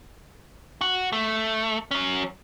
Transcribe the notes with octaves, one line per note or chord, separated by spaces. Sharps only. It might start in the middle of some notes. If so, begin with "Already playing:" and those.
F#4
A3
F#3 C#4